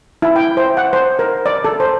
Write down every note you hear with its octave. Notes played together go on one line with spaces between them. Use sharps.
E4
G5
C5
F#5
C5
A#4
D5
A4
C5